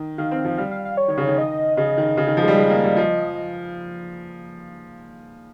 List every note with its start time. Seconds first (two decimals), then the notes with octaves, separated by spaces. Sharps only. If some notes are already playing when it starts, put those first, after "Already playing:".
Already playing: D#3
0.18 D#3 F5
0.31 C4
0.45 F3
0.57 G3 F5
0.71 F5
0.85 F5
0.97 C#5
1.08 D#3
1.17 C#3
1.27 D#3
1.38 D#5
1.77 C#3 D#5
1.98 D#3
2.17 C#3
2.27 D#3
2.37 F3
2.43 G#3
2.48 G3
2.57 G#3
2.70 A#3
2.84 G3
2.97 F3